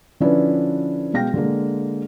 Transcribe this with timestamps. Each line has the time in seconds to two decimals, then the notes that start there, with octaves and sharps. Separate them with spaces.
0.20 D3 F3 C#4 D4 E4 B4
1.14 B2 G#3 F5 G5 A#6
1.34 D3 G#3 A#3